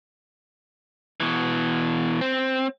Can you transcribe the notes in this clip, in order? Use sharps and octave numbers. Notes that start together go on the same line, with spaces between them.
B2 E3
C4